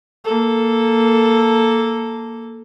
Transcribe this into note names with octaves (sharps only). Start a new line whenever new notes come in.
A#3 A4